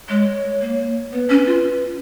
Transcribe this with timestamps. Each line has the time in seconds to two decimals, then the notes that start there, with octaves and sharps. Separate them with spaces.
0.09 G#3 C#5
0.61 A#3
1.12 B3 B4
1.30 C#4
1.46 F4